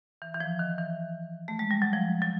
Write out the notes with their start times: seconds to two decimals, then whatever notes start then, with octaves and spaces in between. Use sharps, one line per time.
0.22 E3
0.34 E3
0.40 F3
0.59 D#3
0.78 E3
1.48 A3
1.59 G#3
1.71 G3
1.82 F#3
1.93 F3
2.22 F#3